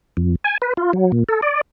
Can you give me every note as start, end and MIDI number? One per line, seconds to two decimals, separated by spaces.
0.17 0.35 41
0.44 0.58 80
0.62 0.73 71
0.77 0.93 65
0.93 1.12 54
1.12 1.24 46
1.29 1.41 69
1.42 1.61 74